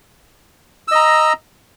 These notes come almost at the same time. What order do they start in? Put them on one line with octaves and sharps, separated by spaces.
E6 D#5 A#5